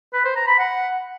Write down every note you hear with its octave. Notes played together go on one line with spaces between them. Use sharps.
B4
C5
A#5
B5
F#5